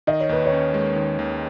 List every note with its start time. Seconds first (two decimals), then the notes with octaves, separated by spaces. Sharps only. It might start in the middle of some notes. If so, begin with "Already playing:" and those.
0.07 D#3 D#5
0.20 C#5
0.29 D#2 B4
0.46 C#5
0.52 C#4
0.74 G#3
0.96 D#3
1.19 D#2